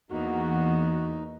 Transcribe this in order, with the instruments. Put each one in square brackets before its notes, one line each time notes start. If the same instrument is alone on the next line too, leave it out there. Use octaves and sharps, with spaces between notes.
[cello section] E2 [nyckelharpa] A#3 B3 [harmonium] D#4 [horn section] F#4